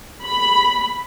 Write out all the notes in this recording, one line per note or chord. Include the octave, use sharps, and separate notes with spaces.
B5